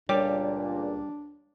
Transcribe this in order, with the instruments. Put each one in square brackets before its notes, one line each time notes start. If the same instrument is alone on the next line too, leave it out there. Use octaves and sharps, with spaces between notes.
[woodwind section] C#2 A#2 [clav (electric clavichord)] G3 G4 [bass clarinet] D4 [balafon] C#5